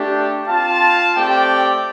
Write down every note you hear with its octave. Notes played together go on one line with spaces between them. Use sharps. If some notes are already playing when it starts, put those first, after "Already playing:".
Already playing: A3 D4 G4
C4 F4 F5 A5
A3 C4 G4 D5 G5